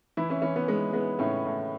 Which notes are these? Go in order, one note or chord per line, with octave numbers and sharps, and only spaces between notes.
E3 E4
C#4
E3 C#4
B3
G#3 B3
G#3 B3
A2 C#4
A2